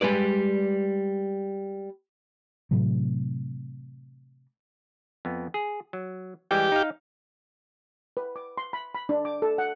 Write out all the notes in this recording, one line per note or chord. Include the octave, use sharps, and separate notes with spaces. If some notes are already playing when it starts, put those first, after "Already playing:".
G3 G#3 B4 D5
A2 C3 E3 F#3
F2 B3
G#4
F#3
E3 G3 G#3 G4
D#4 F5
B4
D6
C6
B5
B5
D4
D6
A4
F#5